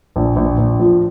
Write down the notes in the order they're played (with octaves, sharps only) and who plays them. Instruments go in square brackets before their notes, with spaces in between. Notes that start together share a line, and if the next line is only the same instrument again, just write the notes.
[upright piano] A#1
A#1
A#1
F3